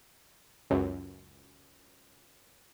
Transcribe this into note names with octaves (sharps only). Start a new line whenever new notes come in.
C#2 F#2